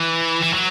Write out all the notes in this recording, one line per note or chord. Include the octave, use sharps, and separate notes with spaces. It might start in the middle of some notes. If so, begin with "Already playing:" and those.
Already playing: E3
E3
F#3